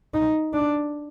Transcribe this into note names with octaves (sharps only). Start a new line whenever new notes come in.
D#4
D4